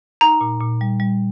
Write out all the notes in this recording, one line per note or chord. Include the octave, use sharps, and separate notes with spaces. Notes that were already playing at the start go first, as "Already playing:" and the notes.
D#4 A#5
A#2
A#2
G3
G3